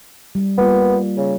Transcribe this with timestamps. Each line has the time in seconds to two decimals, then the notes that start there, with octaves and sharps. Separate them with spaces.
0.35 G3
0.58 G3 A#3 B3 F4
1.17 C#3